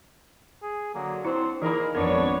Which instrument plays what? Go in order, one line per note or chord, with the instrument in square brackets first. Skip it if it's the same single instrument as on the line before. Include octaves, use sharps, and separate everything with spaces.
[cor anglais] G#4
[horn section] D3 F#3 [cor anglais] A#3
[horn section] C4 D4 [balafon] E4 [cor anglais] C5
[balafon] E3 B5 [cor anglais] A#3 [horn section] D#4 G#4 A#4
[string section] G#1 F2 C#5 [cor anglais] B3 [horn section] D4 [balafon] A#4